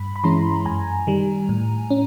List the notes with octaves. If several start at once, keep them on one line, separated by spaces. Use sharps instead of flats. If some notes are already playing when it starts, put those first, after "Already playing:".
Already playing: G2 B5
B5
E3 G#3 C#4 E4 A#5 C6
F#2 G#5 A#5
D#3 G3
A2
C#4